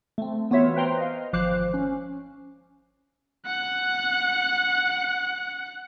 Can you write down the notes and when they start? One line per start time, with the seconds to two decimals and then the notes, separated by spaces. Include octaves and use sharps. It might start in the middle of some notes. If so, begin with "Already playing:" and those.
0.18 A3 C4
0.50 E3 B3 F4 F#4 C#5 E5
0.76 B4 C5 G5 A#5 C6
0.97 D#5 F5
1.33 G#1 F3 C5 D6 F#6 C7
1.74 C#4
3.46 F#5 F#6